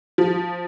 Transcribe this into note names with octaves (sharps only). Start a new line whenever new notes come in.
F3